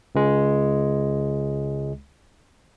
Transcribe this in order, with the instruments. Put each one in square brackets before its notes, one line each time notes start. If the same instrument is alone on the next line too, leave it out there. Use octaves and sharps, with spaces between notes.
[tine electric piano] C#2 G#3